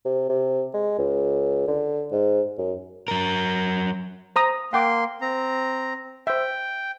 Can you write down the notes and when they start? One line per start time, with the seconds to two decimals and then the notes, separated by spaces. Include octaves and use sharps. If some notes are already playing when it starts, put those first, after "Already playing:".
0.05 C3
0.29 C3
0.74 G#3
0.99 C#2
1.68 D3
2.12 G#2
2.58 F#2
3.08 F#3 A#4
4.36 C5 A#5 D#6
4.73 A#3 F#5 G5 C6 D6
5.21 C4 A#5
6.27 C5 E5 G5